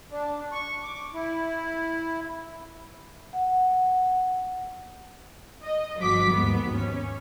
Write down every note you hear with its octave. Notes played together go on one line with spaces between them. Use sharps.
D4
C#6
D6
E4
F#5
D#5
G1 F3 F#4 D6 B6
D#2 G#2 B3
C#4